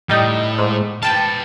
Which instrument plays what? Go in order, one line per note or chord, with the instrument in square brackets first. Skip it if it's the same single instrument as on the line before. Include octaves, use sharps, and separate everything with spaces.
[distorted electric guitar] A2 [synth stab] G3 D#4
[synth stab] G#2
[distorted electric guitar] B4 F5 [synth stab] G5 A5